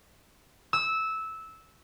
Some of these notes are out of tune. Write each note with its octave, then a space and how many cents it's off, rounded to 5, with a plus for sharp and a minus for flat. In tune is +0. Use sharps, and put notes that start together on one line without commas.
E6 -15